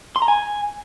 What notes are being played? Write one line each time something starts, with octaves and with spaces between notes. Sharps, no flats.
C6
A#5
G#5